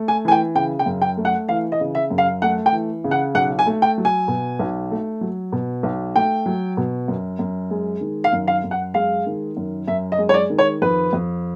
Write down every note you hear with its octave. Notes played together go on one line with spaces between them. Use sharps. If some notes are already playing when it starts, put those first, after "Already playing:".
Already playing: A3
G#5
E3 G#5
G5
C#3 G5
G5
F#2
G5
A3
F#5
E3 F5
D#5
C#3
E5
F#2
F5
A3 F#5
G5
E3
C#3
F#5
B1 F#5
G#5
A3
G5
F#3
G#5
B2
B1
A3
F#3
B2
B1
A3 G5
F#3
B2
F#2
F#2
G#3
D#3
F5
F#2
F5
F#2
F#5
G#3 F5
D#3
F#2
F#2 E5
D#5
G#3
C#5
D5
D#3
C#5
F2 B4
F2